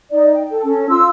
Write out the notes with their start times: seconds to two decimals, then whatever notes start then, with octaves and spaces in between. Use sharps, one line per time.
0.10 D#4 D5
0.34 G5
0.51 A4
0.63 C#4 A4
0.89 F4 C6 E6